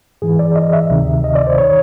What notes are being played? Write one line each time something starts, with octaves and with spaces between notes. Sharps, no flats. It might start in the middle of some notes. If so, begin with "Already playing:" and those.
G#2 E3 G#4
D5
D#5
E5
D2 C3 D#3
D#5
D5
C5
D#3 C#5